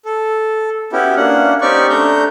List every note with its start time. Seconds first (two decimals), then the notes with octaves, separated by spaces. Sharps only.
0.05 A4
0.92 B3 C#4 E4 F#4 G4
1.16 A#3 C#4 D4 F#5
1.61 C4 C#4 D#4 G4 D5 C#6
1.89 A3 D4 A#5 G6